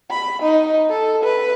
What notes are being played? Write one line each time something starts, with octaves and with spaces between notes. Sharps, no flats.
B5
D#4
A4
B4